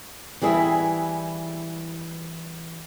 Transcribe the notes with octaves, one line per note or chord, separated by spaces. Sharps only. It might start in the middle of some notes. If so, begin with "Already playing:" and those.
E3 G3 G#4 E5